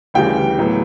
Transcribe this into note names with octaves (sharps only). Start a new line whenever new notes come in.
D2 C#3 E3 G3 G5
A2 F#3 B3